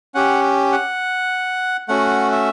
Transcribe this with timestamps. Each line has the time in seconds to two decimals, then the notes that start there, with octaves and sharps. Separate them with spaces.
0.15 C#4 G4 F#5
0.72 F#5
1.88 A3 C#4 F#4 F#5
2.32 E5